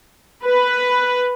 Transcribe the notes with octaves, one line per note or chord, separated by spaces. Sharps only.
B4